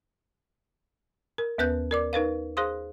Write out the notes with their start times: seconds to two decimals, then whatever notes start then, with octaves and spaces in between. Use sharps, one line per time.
1.38 A#4
1.58 D#2 B3 B4 F#6 G6
1.91 A#4 D5 D6
2.13 D#4 A#4 B4 F5
2.57 G#4 C5 F5 C6 D#6